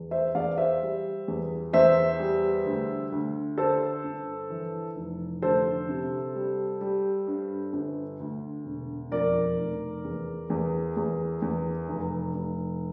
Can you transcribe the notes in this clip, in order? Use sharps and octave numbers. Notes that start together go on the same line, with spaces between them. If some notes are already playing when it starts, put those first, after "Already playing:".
Already playing: E2
C5 E5
E2 D5 F5
C5 E5
G3
E2
E2 C5 E5
G3
D2
D2
D3 A4 C5
G1
E3
F1
D2 A4 C5
C3
G3
G3
G2
G1
D2
E1
F2 A#4 D5
F1
E2
E2
E2
E2
F1
F1